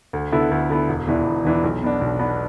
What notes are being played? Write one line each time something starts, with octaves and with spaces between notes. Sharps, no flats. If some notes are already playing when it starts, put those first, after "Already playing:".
D2
D3 B3 E4
D2
D3 B3 E4
E1
E2 E3 D4
E1
E2 E3 D4
B1
B2 B3 D4
B1
B2 B3 D4